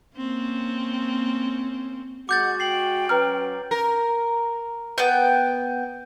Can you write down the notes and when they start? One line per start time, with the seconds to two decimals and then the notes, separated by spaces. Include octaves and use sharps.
0.17 A#3 C4 C#4
2.29 G#3 F#4 F#5 D6 G6 A6
2.60 G5 C7 F#7
3.09 F#3 C#4 B4 A#5 F6
3.71 A#4
4.98 B3 G5